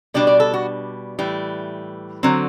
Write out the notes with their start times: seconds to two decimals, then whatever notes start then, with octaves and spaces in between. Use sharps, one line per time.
0.14 B2 G3 D4 D5
0.27 D5
0.40 A4
0.54 F#4
1.19 A2 E3 G3
2.23 D3 F#3 C4